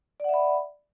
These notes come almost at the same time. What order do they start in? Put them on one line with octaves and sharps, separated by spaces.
D5 F#5 E5 B5